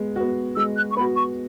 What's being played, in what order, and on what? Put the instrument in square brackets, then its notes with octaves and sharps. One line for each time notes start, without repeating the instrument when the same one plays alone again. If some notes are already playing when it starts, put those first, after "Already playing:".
Already playing: [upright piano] G#3 B3
B3 F#4
[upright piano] G#3 [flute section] E6
[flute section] F#6
C#6
[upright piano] B3 F#4 [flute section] B5
[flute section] C#6